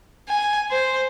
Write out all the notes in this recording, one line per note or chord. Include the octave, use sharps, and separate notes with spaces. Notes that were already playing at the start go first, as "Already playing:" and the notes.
G#5
C5